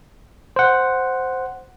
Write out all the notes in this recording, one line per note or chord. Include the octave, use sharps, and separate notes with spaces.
C5 F#5